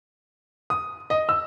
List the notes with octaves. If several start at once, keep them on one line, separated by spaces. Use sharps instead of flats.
D#6
D#5
E6